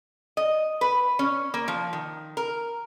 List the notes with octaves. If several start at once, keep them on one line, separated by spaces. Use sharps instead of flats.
D#5
B4
C#4
A#3
F3
D#3
A#4